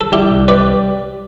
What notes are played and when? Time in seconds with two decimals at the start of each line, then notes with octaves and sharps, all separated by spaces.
0.01 A4
0.12 G3 E4 G4
0.30 C2
0.48 G3 B4 D5